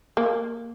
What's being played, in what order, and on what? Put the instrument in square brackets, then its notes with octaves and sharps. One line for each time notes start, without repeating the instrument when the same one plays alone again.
[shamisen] A#3